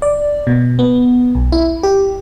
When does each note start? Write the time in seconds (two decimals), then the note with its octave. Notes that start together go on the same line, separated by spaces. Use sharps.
0.02 D5
0.47 B2
0.79 B3
1.35 B1
1.52 E4
1.83 G4